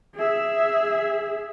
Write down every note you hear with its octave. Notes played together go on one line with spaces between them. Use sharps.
G#4 E5